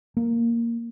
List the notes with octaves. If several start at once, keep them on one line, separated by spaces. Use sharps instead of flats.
A#3